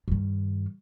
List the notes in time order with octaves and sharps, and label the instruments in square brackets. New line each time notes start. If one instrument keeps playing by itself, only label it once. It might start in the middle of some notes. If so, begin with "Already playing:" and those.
[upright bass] G2 D#3